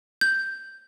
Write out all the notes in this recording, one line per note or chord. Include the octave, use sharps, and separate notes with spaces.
G6